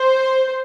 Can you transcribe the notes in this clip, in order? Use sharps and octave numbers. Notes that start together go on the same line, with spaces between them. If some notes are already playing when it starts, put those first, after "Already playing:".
Already playing: C5